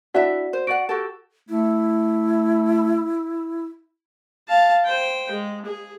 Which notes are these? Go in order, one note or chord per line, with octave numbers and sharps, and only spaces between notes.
D4 E4 F#4 D5 E5 F#5
C5
F#4 D5 F#5 D7
F#4 G4 A4
A3 E4
F5 A5
C5 G5
G#3
G#4